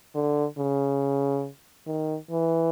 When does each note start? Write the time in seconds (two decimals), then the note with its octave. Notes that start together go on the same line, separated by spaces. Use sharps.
0.15 D3
0.58 C#3
1.87 D#3
2.30 E3